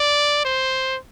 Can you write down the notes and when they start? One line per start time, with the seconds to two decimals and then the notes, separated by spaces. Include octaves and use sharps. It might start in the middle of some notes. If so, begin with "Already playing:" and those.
Already playing: D5
0.45 C5